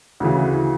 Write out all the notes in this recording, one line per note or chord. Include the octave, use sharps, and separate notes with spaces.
D2 C#3 E3